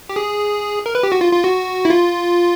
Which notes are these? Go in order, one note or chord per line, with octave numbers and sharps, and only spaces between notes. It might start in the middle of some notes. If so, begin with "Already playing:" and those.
G4
G#4
A#4
B4
G4
F#4
F4
F4
F#4
E4
F4